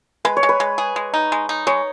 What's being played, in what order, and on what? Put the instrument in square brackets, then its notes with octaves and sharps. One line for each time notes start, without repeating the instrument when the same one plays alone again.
[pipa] G#3 [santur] B4
[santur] C#5
[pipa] G#3
[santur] B4
[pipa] G#3
G#4
G#3
D#4
G#3
D#4
[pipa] G#3 [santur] C#5